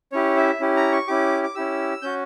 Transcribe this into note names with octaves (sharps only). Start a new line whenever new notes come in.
C#4 E4 G4 C#5
E5
C#4 E4 G4
A#5
C#6
C#4 E4 G4 D6
D6
C#4 E4 G4 E6
C#4 F#4 G6